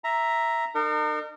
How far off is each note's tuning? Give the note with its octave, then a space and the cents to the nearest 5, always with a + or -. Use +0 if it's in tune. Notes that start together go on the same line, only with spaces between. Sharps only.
E5 +0 A#5 +0
D#4 -45 A#4 -35